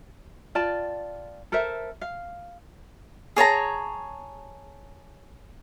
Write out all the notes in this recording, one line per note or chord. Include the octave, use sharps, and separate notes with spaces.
F4 D5 G5 A5
A4 A#4 C5 E5
F5
G#4 C#5 A5 A#5